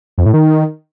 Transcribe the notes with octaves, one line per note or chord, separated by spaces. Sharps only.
F2
A2
D#3